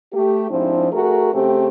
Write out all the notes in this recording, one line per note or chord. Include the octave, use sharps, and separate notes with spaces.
A3 G4
G#2 F3 C4 D4 E4
A3 F#4 G#4 A#4
C#3 A3 C4 G4